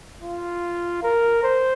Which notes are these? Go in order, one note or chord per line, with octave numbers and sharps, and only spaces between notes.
F4
A#4
C5